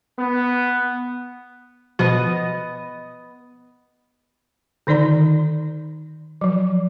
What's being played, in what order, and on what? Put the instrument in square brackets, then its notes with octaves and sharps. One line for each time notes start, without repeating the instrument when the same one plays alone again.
[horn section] B3
[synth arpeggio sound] B2 F3 F#4 [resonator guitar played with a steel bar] B3 D#5
[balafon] D3 D#3 D#4 D5 A#5
F3 F#3